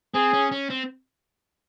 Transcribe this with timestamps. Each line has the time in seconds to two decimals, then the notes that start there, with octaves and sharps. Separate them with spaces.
0.14 C4 G#4
0.33 C#4
0.52 C#4
0.70 C4